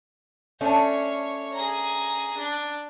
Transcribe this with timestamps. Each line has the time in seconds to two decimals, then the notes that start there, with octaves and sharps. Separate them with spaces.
0.61 A3 C#4 D4 C#5
1.54 G#4 A#5
2.38 D4